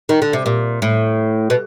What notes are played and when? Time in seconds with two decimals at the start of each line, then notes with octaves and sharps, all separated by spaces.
0.09 D#3
0.22 D3
0.33 C3
0.46 A#2
0.82 A2
1.50 B2